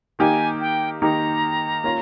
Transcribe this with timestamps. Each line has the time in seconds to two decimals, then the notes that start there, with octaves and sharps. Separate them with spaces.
0.19 D#3 A#3 D#4 G4 G#5
0.61 G5
1.02 D#3 A#3 D#4 G4 A#5
1.84 A#3 C#4 F4